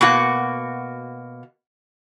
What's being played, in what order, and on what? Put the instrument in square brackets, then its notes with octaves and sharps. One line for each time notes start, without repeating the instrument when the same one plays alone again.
[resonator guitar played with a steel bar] B2 A#3 F#4